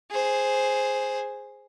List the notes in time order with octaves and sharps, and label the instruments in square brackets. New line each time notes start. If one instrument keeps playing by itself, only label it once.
[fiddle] G#4 C5